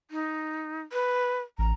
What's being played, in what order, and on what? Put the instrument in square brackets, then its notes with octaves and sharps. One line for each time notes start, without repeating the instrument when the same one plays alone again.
[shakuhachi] D#4
B4
[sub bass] A1 [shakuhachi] A#5